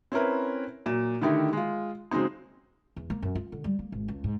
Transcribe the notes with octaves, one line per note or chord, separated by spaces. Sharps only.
C4 C#4 E4 A#4 B4
A#2 F#3 E7
D3 D#3 A3 D#4 E4 G4
G#3 F4
C#3 F#3 G#3 C4 D#4
E2
A#3
F#2
F4
D3
G3
A#3
G#1
C#2
G#2